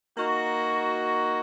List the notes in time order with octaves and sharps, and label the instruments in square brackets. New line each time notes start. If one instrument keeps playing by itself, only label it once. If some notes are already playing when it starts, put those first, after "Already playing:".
[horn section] A#3 D#4 F#4